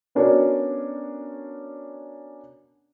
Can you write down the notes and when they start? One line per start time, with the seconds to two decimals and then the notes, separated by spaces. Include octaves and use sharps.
0.15 B3 C#4 D4 F#4 A#4 C#5